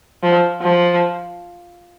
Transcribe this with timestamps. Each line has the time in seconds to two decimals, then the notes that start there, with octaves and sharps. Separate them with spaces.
0.23 F3
0.62 F3